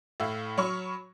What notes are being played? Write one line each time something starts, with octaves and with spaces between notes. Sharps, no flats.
A2 E4 F5 E6
F#3 C#5 B5 C#6 F6